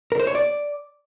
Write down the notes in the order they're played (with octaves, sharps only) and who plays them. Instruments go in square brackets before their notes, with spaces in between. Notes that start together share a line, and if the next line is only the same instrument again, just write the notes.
[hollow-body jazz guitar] A#4
C5
C#5
D5